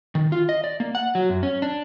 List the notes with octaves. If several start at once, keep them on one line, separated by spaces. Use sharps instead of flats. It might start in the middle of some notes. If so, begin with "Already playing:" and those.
D#3
F4
D#5
D5
A#3
F#5
F#3
F#2
C#4
D4